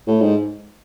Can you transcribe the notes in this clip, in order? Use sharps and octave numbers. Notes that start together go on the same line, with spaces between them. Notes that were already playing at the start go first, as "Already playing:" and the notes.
A2
G#2